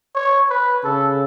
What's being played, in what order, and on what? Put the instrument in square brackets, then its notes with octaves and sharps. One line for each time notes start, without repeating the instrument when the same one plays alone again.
[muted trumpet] C#5
B4
[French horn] C#3 [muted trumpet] A4